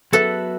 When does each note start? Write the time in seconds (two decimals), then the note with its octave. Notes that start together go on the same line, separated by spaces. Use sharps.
0.13 F#3 B3 F#4 A4 B4 E5